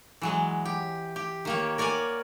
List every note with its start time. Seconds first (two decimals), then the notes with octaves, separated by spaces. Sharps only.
0.22 E3 F#3 G#3
0.66 G4
1.16 G4
1.45 D#3 A#3 C#5
1.78 A#4 C#5 D5 F#5 G#5